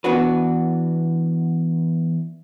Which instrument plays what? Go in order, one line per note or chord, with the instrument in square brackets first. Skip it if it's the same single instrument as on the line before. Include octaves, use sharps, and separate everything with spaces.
[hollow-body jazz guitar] E3 B3 D4 F#4 B4